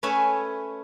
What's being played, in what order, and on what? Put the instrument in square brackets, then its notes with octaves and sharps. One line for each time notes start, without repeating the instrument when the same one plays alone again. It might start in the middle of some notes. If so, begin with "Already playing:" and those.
[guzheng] A3 C#4 B4 C#5 E5 G#5